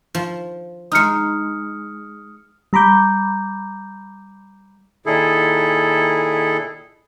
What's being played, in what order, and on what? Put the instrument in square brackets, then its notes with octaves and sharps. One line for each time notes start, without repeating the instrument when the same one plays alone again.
[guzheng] F3
[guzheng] G#3 D#4 [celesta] D#6 F6 C#7
[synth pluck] G3 A#5 B5 D6 G6
[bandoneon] A#2 D#3 E4 G#4 A4